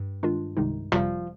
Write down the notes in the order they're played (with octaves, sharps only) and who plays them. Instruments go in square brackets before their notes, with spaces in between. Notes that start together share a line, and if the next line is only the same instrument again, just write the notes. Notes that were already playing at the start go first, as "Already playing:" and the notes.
Already playing: [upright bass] G2
[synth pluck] D#3 G#3 D4 F4
C2 C3 D#3 G#3 D#4
[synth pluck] G1 F2 C3 G3 [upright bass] F3